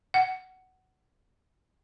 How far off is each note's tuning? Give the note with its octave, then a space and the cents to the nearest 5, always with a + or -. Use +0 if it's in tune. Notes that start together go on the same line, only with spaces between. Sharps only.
F#5 +15